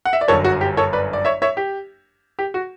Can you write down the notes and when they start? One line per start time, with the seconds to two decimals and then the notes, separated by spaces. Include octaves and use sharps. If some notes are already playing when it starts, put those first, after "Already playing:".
0.05 F#5
0.13 E5
0.21 D5
0.28 G1 F#2 D3 F#3 A4 C#5
0.44 F#4
0.61 G4
0.77 A4 C#5
0.93 B4 D5
1.13 D5
1.25 C#5 E5
1.42 C#5 E5
1.57 G4
2.39 G4
2.54 F#4